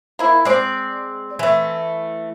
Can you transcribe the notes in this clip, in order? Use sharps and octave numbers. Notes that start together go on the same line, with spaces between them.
A#3 E4
G#3 C4 D5
E3 A3